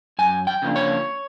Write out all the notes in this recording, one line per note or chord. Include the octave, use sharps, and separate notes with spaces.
F#2 G#5
G5
C#3 F3 A#3 D4
C#5